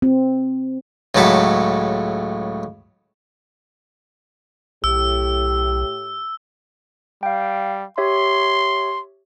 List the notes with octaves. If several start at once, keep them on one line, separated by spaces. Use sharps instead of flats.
C4
C#2 A2 F#3 A4 B5
B1 A2 G4 E6
G3 F5 G5
G4 C#5 E5 C6